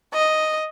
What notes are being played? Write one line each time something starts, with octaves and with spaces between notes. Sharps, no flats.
D#5